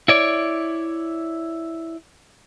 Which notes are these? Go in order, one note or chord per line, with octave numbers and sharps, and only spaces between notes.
E4 C#5 D5